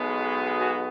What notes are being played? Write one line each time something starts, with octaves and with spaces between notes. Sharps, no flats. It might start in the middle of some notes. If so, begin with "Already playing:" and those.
Already playing: B1 B2 G#3 B3
F#4 G#4